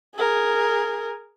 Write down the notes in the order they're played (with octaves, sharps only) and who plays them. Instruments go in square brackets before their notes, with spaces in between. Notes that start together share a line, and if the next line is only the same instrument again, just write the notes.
[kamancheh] G#4 A#4